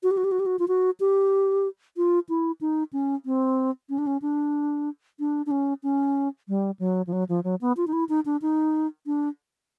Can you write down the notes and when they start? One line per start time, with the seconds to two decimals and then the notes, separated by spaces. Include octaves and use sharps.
0.03 F#4
0.11 G4
0.17 F#4
0.24 G4
0.32 F#4
0.40 G4
0.46 F#4
0.59 F4
0.68 F#4
1.00 G4
1.97 F4
2.29 E4
2.61 D#4
2.93 C#4
3.26 C4
3.89 C#4
3.98 D4
4.07 C#4
4.22 D4
5.20 D4
5.46 D4
5.51 C#4
5.83 C#4
6.48 G3
6.79 F#3
7.07 F3
7.13 F#3
7.29 F3
7.44 F#3
7.61 B3
7.77 F4
7.87 D#4
7.93 E4
8.09 D#4
8.25 D4
8.42 D#4
9.06 D4